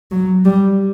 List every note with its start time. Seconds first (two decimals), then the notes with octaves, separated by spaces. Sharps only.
0.11 F#3
0.45 G3